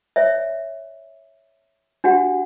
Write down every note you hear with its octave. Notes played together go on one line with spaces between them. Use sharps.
C#5 D5 E5
D4 F#4 G4 F#5